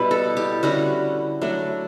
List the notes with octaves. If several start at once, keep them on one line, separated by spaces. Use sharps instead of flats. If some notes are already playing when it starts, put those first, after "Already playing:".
Already playing: B2 G3 B3 E4 B4
A4
G4
D3 G3 C#4 E4 F#4
F#3 A3 D4